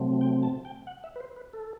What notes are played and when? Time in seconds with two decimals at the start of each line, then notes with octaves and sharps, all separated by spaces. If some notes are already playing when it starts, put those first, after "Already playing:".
Already playing: C3 F#3 A3 C4
0.21 G5
0.43 A5
0.65 G5
0.87 F#5
1.04 E5
1.16 B4
1.20 C5
1.36 B4
1.53 A4